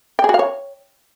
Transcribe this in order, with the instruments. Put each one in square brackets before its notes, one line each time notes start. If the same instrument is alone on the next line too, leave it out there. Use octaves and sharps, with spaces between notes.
[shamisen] G5
G#4
F#4
F5
C#5